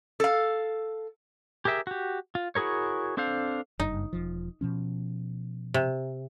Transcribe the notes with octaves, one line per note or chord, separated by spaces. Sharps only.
A4 F5
G4 G#4 A#4 E5 G5
F#4 G4
F4
E4 F#4 G#4 A#4 C#5
C4 D4 A4 C5 F5
F#1 G2 D#4
E1 F3
B2 F3 C#4
C3